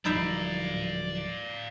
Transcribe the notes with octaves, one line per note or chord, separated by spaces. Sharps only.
D1 F3 G3 D#4 E4 D5 E5 F5